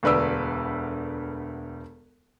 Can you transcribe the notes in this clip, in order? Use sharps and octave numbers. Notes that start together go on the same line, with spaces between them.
E1 D2 B4 D5 E6